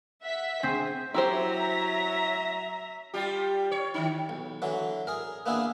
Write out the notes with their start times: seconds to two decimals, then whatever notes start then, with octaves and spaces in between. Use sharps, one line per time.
0.23 E5 F#5 B6
0.63 C4 G#4
1.14 F#3 E4 G4 C5 E5 A#5
3.14 G3 F4 G4
3.71 C#5
3.94 D#3 D#4
4.29 B1
4.62 D3 E3 F#3
5.07 G#4 A#4
5.46 A#3 B3 D4 E4 G#4